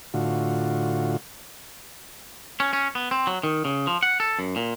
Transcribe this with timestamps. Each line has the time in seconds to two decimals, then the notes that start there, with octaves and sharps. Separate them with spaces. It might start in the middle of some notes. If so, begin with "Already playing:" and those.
0.14 A2 D3 F4 F#4
2.60 C#4
2.73 C#4
2.95 B3
3.11 C4
3.27 F#3
3.43 D#3
3.65 C#3
3.87 F3
4.03 F#5
4.20 A4
4.39 F#2
4.56 A#2